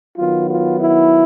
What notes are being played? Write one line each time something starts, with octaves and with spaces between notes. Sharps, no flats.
D#3 F#3 B3 F4
F4
E4